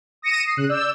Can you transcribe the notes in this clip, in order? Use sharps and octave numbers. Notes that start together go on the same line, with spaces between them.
D#6 A#6 C#7 D#7 E7
D#6 C7
C#3 F#6
D5 E6 G6